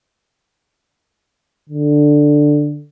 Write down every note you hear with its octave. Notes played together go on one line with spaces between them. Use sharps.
D3